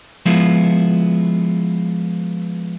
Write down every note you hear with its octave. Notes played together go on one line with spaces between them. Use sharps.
F3 G#3 B3 E4 F4